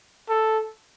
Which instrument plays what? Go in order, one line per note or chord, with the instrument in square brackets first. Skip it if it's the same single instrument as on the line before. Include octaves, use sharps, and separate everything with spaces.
[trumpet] A4